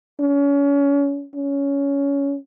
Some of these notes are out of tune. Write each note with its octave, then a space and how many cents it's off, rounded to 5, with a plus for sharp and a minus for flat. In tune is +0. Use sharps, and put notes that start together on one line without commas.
C#4 +30
C#4 +15